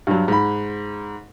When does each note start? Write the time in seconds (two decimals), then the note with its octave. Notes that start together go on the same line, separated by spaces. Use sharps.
0.07 G2 F#3
0.28 G#2 B5